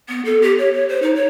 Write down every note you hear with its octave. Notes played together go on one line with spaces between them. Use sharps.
B3
A4
G4
C#5
C#5
C5
D#4
C#5